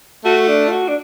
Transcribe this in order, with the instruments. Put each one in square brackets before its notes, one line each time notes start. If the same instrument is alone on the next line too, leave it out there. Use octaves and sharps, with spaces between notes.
[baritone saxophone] A3 [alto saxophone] F#4
[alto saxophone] D4
F4
F#4
D4